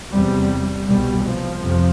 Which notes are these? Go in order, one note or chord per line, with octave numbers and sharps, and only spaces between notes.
E2 C3 G3
C2 B2 G3
F3
F2 C3